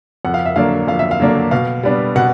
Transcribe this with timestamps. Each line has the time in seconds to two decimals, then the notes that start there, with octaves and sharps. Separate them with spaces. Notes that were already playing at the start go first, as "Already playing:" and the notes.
0.25 F2 F#5
0.34 F5
0.46 E5
0.56 D3 F#3 A#3 D4 F5
0.87 F2 F5
0.99 E5
1.11 F5
1.20 D3 F#3 A#3 D4
1.51 B2 F5
1.83 G3 B3 D4
2.15 B2 F#5